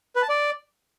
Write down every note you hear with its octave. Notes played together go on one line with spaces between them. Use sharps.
B4
A5
D5